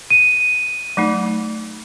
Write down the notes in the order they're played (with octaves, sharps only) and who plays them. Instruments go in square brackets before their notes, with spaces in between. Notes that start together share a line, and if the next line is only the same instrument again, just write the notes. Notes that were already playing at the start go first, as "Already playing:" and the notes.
[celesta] D#7
[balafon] F#3 A3 D#4